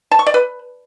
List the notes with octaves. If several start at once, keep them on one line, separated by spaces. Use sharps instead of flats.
A5
C#6
D5
B4